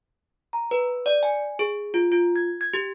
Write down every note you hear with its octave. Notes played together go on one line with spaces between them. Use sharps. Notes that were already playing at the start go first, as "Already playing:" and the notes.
A#5
B4
D5
G#5
G#4
F4
F4
G#6
G#6
G4